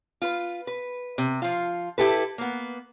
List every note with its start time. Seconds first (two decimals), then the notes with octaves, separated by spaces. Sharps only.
0.22 F4 B4
0.67 B4
1.18 C3
1.42 F3 F4
1.98 E4 G4 A4 B4
2.38 A#3 B3